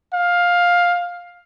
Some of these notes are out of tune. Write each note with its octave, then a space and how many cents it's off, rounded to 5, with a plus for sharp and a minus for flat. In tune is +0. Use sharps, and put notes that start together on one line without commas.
F5 +10